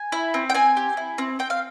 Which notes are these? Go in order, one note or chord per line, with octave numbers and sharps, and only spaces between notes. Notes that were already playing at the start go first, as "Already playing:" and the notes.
Already playing: G#5
E4
C4
G5
C4 G#5
G4
E4
C4
C4 G5
F5